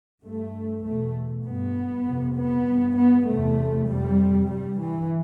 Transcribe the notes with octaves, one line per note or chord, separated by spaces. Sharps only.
G2 A3
E2 B2 A3
G2 B3
F2 C3
B3
G2
B3
E2 C3 A3
F2 C3 G3
G2 G3
E3